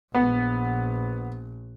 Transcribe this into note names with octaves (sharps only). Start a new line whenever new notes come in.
A#1 B3